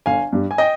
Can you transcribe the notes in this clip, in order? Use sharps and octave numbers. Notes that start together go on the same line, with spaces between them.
G1 F5 G#5
G2 G3
G#5
D#5 G5